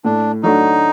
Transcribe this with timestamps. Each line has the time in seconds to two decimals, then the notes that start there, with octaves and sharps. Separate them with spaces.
0.05 A2 D4
0.43 F#3 A3 D4 D#4 F#4